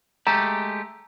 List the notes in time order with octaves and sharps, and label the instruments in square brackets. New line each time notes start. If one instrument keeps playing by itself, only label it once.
[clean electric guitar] G#3 A3 G4 [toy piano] A#5